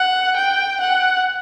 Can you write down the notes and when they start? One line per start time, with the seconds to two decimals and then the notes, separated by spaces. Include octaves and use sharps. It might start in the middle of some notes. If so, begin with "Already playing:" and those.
Already playing: F#5
0.37 G5
0.80 F#5